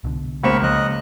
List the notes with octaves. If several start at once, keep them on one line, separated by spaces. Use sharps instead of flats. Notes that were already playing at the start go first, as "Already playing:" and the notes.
C2 B2 D3
C#2 A#3 C5 B5 C#6 E7
F3 D#5 F#6